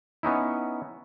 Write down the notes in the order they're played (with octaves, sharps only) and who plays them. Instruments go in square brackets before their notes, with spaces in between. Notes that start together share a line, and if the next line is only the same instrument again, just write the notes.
[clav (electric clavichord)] B3 C#4 D#4 E4